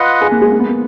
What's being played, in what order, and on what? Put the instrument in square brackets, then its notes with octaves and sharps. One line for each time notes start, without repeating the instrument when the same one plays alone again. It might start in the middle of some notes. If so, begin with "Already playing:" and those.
Already playing: [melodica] F4 B4 D#5 F#5
[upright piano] G#4
A#3
G#3
A#3
B3
A#3